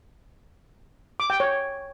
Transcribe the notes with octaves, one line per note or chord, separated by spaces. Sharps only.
D6
G5
C#5